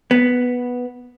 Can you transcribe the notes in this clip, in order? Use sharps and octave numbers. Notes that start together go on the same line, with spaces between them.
B3